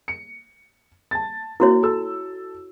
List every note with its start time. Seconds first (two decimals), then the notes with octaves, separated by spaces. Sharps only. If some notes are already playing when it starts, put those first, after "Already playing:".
0.08 C#7
1.11 A5 A6
1.60 A#3 E4 F#4 C#5
1.83 A4 E6